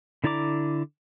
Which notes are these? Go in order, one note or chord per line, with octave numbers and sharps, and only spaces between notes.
D3 E4 D5 A#5 D6